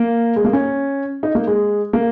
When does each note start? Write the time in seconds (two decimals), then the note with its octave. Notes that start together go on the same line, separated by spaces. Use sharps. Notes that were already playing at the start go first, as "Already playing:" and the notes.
Already playing: A#3
0.36 G#3
0.45 A#3
0.53 C#4
1.23 D#4
1.35 A#3
1.47 G#3
1.93 A#3